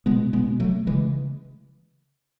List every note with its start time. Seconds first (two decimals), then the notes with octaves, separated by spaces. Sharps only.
0.06 B2 G#3 B3
0.27 B2
0.33 G#3 B3
0.47 B2
0.60 F#3 A3
0.67 B2
0.87 C#3 E3 G#3